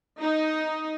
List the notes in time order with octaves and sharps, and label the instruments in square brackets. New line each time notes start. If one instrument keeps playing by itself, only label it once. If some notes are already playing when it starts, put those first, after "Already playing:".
[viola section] D#4